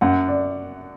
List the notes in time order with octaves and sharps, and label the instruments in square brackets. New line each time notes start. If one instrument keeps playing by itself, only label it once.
[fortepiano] F#2 [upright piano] F#5
[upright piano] D5